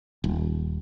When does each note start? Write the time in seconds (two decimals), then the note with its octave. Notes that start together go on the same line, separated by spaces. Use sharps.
0.24 D#1